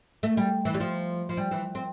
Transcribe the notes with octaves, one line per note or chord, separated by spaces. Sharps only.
A3
G3
E3
G3
F3
F3
G3
E3
C4